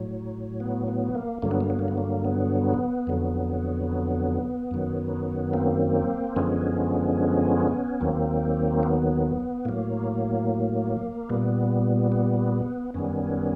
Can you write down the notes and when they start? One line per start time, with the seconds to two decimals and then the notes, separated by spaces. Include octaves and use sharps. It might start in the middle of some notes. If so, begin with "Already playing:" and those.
Already playing: A2 F#3
0.60 B3
0.88 B3
1.15 A#3
1.42 G2 D3 F#3 A#3
1.51 B3
1.61 A#3
1.70 B3
1.79 A#3
1.88 B3
1.98 A#3
2.25 B3
3.07 F2 D3 F#3
4.71 F#2 D#3 F#3
5.53 A#3 C4
6.36 F#2 D3 F3 G#3 B3 C#4
8.00 D#2 D#3 F#3 A#3 C4
8.83 B3
9.65 A2 F#3 A#3
11.30 A#2 G3 B3
12.12 B3
12.94 F#2 D#3 G3 B3 C#4